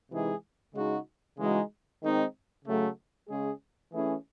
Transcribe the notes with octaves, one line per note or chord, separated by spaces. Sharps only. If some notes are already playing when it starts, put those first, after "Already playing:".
C3 E3 G#3 D#4 G#4
C#3 G#3 D#4 F#4
C#3 E3 G#3 D#4 F#4
D#3 G#3 C4 D#4
C#3 F#3 A3
C#3 G#3 C#4 G#4
E3 A3 C#4 E4 G#4